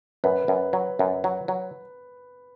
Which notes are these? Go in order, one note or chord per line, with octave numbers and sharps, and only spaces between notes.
F#2 B4
F#2
F#3
F#2
F#3
F#3